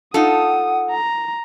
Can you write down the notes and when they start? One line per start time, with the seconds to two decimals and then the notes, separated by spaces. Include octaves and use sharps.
0.14 D#4 F4 A4 F#5 D#6
0.90 A#5